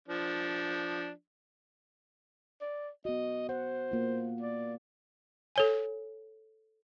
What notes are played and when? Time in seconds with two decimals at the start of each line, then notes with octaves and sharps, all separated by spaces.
0.08 F3 D4
2.61 D5
3.05 B3 F#4 D#5
3.49 C5 F#5
3.92 A#3 F4
4.41 D5
5.56 A4 C#5 G#5